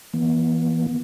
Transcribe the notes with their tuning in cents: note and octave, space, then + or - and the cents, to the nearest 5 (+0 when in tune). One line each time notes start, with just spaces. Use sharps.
E3 +0 B3 -45